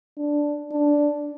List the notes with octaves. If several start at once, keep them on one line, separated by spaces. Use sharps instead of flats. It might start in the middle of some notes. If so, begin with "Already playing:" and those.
D4
D4